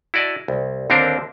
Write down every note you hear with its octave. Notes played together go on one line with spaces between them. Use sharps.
E4 F#4 D5 D#5 A5
C2
D#2 D3 C4 D4 A#4 C5